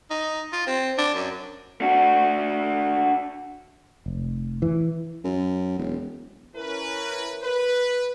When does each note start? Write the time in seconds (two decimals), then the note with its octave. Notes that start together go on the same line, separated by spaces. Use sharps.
0.10 D#4
0.52 F4
0.66 C4
0.98 D4
1.14 F#2
1.81 D4 F#4
4.06 F1
4.62 E3
5.24 F#2
5.79 E1
6.56 C#4 E4 A#4 B4
7.42 B4